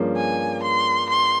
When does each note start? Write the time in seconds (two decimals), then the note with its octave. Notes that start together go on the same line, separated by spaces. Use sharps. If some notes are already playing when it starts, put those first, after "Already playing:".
Already playing: G2 F3 A#3 C#4 G#4
0.16 G#5
0.63 C6
1.09 C6